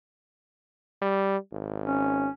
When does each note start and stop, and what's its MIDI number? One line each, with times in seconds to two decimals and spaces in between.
1.02 1.37 55
1.52 2.28 32
1.86 2.29 61